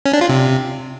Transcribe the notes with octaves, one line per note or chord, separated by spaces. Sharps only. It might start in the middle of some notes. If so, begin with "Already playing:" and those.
C#4
D4
F4
C3